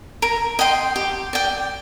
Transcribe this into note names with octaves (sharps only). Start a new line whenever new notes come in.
A#4
D#5 G5 C6
G4
D5 G5